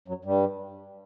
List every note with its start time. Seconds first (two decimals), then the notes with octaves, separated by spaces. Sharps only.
0.08 F#2 F#3
0.25 G2 G3